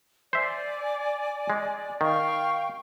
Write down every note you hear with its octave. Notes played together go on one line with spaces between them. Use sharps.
C5 D5 E5 G#5
G#3
D#3 F5 G5 C#6